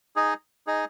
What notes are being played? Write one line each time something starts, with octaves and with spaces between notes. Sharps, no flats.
D#4 G#4 D#5
D#4 G#4 D#5